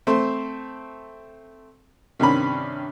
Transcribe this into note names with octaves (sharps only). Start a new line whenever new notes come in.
A3 C4 C5
G2 C3 D#3 C#4 B5